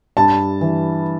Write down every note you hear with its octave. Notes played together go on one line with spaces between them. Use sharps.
G2 A5
E3